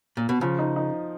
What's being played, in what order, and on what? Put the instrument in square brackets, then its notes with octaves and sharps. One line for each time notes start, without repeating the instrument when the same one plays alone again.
[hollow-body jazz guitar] A#2
B2
[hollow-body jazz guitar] C#3 [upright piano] F3
[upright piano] D#4
D#4